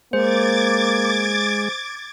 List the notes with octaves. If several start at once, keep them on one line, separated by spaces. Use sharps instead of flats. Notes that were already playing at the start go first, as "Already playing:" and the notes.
G#3 A#3 C5 D6 G#6 A6